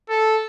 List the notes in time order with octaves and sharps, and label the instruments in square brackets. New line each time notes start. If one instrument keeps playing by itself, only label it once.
[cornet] A4